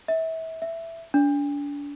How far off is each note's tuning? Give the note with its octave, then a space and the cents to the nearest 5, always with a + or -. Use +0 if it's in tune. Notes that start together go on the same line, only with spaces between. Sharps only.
E5 -30
E5 +5
D4 -35